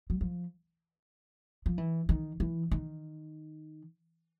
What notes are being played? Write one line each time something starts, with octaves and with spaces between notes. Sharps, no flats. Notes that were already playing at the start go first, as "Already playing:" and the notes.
F#3
F3
F3
E3
D#3
E3
D#3